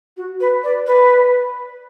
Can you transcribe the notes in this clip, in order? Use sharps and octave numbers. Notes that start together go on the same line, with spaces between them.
F#4
B4
D5
B4